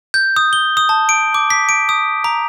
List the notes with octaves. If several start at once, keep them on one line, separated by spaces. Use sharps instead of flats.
G6
D#6
G7
D#6
A5
D7
D6
B6
D7
D#6
A#5